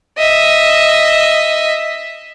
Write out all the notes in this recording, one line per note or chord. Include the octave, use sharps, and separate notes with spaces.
D#5 E5